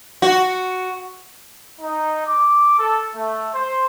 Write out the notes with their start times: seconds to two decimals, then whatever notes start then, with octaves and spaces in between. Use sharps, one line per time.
0.22 F#4
1.81 D#4
2.26 D6
2.78 A4
3.15 A3
3.55 C5